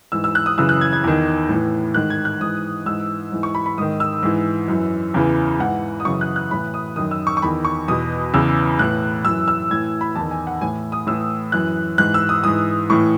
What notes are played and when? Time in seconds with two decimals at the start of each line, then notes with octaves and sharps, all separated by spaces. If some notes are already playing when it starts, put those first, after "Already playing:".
0.12 G#2 E3 E6
0.24 E6
0.35 F#6
0.46 D#6
0.58 F#2 C#3 E3 E6
0.69 F#6
0.81 G#6
0.93 G#6
1.04 E2 D#3
1.49 A2 E3
1.94 G#2 D#3 F#6
2.10 G#6
2.25 F#6
2.41 G#2 E3 D#6
2.86 G#2 E3 E6
3.32 G#2 E3
3.43 C#6
3.55 B5
3.66 B5
3.78 G#2 D#3 D#6
4.00 E6
4.23 G#2 E3
4.68 F#2 E3
5.14 E2 C#3 E3
5.59 G#2 E3 F#5
6.00 D#6
6.05 F#2 C#3 E3 C#6
6.21 F#6
6.36 F#6
6.51 A2 E3 B5
6.74 D#6
6.96 F#2 D#3 D#6
7.11 E6
7.27 C#6
7.37 C#6
7.42 E2 D#3 B5
7.65 C#6
7.88 E2 B2 D#6
8.34 E2 C#3 E3 E6
8.79 A2 F#6
8.84 E3
9.24 F#2 E6
9.28 E3
9.48 E6
9.71 A2 E3 G#6
10.01 B5
10.15 E2 A5
10.21 D#3
10.31 G#5
10.47 F#5
10.61 A2 E3 G#5
10.92 D#6
11.07 A2 E3 E6
11.52 F#2 E3 F#6
11.98 G#2 E3 F#6
12.14 E6
12.29 D#6
12.44 G#2 E3 D#6
12.90 A2 E3 C#6